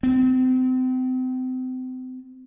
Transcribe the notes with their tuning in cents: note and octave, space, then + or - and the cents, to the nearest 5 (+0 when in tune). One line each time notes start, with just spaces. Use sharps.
C4 -35